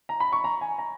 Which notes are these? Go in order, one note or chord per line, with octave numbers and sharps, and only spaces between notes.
A#5
B5
C#6
A#5
G#5
A#5